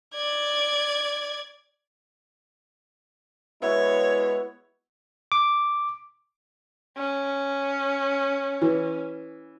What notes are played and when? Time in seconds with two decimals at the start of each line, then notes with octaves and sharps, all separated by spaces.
0.15 D5 G#6
3.62 G#3 B3 E4 F#4 C#5 E5
5.32 D6
6.98 C#4
8.62 E3